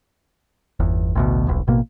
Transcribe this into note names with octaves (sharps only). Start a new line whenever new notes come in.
G1 E2
A1 D2 B2
D#1 B1
A1 B2 A#3